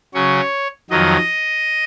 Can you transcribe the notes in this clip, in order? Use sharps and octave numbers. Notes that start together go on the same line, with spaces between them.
C#3 F#3 C#4 C#5
F2 D#3 F#3 D#5